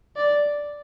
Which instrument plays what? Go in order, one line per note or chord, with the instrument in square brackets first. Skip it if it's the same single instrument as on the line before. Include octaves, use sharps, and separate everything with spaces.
[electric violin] D5